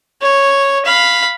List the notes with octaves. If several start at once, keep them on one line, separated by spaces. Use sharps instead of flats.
C#5
F5 B5